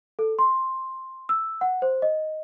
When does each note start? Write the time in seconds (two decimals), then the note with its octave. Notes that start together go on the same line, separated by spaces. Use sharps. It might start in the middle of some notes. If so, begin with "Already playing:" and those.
0.19 A4
0.39 C6
1.29 E6
1.61 F#5
1.82 C5
2.02 D#5